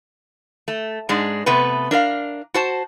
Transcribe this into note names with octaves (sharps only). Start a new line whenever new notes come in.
A3
G#2 G#3 D4
C3 A3 B3 B4
D4 A#4 D5 F5
F#4 C5 A5